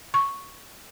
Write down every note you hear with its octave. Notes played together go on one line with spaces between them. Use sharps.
C#6